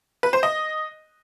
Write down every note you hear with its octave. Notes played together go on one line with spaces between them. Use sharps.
B4
C5
D#5